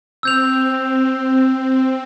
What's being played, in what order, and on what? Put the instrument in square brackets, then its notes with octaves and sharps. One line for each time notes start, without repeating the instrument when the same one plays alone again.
[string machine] C4 [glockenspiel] E6 G6 F7